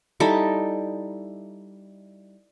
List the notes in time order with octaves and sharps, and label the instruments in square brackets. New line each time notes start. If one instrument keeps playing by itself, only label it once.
[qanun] G3 D#4 E4 A4